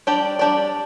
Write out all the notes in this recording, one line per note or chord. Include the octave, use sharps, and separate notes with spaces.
G3 D4 G4 D5
G3 D4 G4 D5